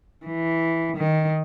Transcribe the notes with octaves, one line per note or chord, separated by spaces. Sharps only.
E3
D#3